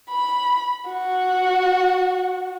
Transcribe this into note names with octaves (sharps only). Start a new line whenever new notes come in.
B5
F#4